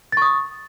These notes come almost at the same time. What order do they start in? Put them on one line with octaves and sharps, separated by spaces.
A6 C#6 D#6